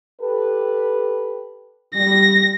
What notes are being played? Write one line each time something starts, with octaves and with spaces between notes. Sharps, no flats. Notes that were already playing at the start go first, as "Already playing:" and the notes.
G4 A4 B4
G3 A#6